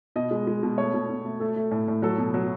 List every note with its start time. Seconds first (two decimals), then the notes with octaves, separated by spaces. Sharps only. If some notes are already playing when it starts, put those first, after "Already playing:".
0.16 B2 D#5
0.31 G#3
0.47 G#3
0.63 B2
0.78 A3 C#5
0.94 B2
1.09 B2
1.25 A3
1.40 A3 A4
1.56 A3
1.71 A2
1.88 A2
2.02 F#3 A4
2.18 B2
2.34 F#3